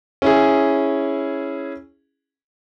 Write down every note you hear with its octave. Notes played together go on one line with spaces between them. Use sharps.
C#4 E4 G#4